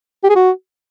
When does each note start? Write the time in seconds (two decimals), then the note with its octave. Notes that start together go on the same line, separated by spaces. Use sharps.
0.24 G4
0.30 G#4
0.36 F#4